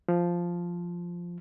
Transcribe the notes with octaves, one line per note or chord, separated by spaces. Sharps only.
F3